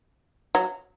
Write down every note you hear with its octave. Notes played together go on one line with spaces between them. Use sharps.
F#3